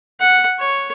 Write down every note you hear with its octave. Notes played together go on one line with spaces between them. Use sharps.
F#5
C#5